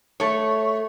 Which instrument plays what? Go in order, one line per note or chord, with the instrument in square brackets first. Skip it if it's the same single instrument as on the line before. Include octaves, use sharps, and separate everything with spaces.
[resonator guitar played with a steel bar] A3 C#5